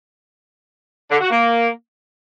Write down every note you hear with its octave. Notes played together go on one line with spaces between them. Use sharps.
D3
F#4
A#3